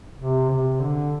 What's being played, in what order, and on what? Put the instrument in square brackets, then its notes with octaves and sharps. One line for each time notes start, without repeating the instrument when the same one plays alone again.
[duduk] C3
C3
D3